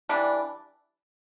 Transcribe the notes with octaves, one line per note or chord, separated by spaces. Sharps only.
E3 G3 D4